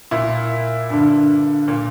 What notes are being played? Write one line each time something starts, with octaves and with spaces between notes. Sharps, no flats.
A#2 E4
G2 D3
A#2